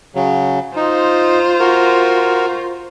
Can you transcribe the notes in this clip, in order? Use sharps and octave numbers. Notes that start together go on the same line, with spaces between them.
C#3 F#3
D#4 F4 C5
F#4 A#4